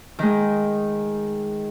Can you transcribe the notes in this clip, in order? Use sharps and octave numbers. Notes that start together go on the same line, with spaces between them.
D#3 G#3